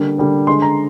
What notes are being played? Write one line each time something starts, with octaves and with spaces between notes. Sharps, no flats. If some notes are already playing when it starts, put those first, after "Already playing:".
Already playing: D3 G3 A#3
D3 G3 A#3
D3 G#3 C6
A#5